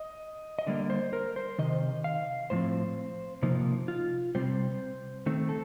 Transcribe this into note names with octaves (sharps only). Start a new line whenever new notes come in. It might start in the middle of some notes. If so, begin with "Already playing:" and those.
Already playing: D#5
D#5
D3 G3 A#3 D5
C5
A#4
C5
C3 D#3 D#5
F5
A2 F3 C4 C5
C3 F3 A#3 D#4
F4
C3 G3 C4 C5
D#3 A3 C4
A4